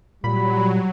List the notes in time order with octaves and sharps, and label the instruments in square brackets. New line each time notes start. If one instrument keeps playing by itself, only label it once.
[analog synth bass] A#2 [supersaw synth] F#3 [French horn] G3 [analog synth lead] B5